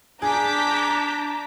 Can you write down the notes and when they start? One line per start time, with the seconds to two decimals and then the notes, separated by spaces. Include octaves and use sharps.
0.22 D4 G#4 A5 A#5 D6 G6 B6